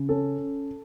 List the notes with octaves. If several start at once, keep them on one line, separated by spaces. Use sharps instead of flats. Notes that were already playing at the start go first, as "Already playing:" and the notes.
Already playing: C#3
C#4 A4